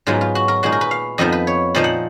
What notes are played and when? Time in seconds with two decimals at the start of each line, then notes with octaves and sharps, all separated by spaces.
0.07 G#2 F#3 B3 D#4 F4
0.21 F4
0.35 F#4
0.48 A#4
0.63 A#2 G#3 D#4 F#4
0.72 A#4
0.81 B4
0.91 F5
1.18 F2 F3 B3 D#4 D#5
1.32 B4
1.47 C#5
1.75 A#2 F3 A#3 D#4 D#5
1.84 F#5